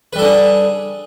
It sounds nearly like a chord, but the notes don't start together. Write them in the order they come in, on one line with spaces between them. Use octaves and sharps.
B4 G3 A4 D4 G#4